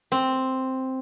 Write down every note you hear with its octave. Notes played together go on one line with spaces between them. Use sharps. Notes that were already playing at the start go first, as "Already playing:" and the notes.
C4